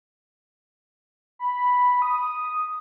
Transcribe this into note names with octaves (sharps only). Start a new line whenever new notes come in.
B5
D#6